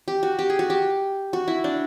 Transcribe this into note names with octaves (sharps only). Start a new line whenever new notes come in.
G4
F#4
G4
G#4
F#4
G4
F#4
E4
D4